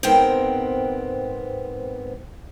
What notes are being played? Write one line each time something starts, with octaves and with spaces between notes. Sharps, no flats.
G#2 B3 C4 A#4 G5